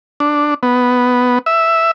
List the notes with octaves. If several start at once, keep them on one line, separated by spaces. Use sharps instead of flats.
D4
B3
E5